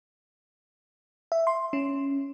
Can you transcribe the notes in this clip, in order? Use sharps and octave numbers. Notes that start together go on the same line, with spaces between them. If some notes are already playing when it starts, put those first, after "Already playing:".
E5
C6
C#4